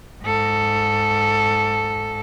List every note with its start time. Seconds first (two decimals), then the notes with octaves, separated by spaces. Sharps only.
0.23 G#2 A4